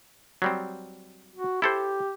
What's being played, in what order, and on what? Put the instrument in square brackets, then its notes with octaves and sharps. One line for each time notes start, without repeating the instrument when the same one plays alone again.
[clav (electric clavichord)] F#3 G3 C4
[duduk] F#4
[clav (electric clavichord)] E4 A4 C5 [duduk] G4